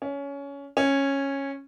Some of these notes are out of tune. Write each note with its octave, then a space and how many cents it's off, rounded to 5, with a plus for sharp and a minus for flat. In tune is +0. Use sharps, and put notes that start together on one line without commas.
C#4 +20
C#4 -10